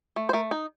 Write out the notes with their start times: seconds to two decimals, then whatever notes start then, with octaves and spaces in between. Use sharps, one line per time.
0.16 A3
0.29 C5
0.33 A3 A#4
0.51 D#4